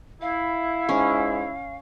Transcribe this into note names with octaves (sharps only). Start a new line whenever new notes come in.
E4 F5
G#2 C#4